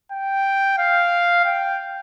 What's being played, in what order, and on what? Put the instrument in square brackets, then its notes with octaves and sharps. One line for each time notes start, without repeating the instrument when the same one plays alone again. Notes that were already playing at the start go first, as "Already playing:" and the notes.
[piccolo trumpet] G5
F5
G5